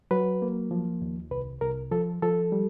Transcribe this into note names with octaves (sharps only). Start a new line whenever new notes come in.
F#3 B4
A#3
F3
D#2
C2 B4
C2 A#4
F3 A4
F3 A4
G3